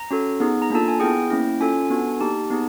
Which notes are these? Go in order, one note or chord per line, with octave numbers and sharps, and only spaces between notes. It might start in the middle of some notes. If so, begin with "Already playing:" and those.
Already playing: A#5
C#4 F#4 A4
B3 D#4 G#4
A#5
A#3 D4 F4 A4 A5
G#5
B3 E4 G#4 G5
A#3 C#4 E4
C#4 F4 A4 G#5
B3 D4 F#4 A4
A#3 D#4 G4 A5
B3 D#4 G#4